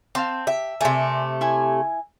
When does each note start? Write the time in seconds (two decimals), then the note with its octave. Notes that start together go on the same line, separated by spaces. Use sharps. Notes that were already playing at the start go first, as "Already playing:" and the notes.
0.15 C4 F5 A5 C6
0.47 G4 E5
0.81 C3 A3 A#4 D5 G#5
1.41 E4 E5 G#5